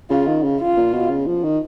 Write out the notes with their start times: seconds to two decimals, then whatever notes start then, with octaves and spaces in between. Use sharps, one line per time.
0.10 C#3 F4
0.27 D#3
0.43 C#3
0.60 F4
0.76 A#2
0.93 B2
1.10 C#3
1.26 F3
1.43 D#3